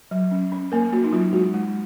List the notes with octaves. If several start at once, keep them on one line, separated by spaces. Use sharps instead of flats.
F#3
C#4
C#4
A#3 A#4
A#3 F#4
D#4
F#3 F4
G#3 F#4
G#3